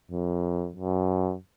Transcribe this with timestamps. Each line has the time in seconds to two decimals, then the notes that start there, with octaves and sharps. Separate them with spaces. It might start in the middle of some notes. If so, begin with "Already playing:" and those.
0.11 F2
0.76 F#2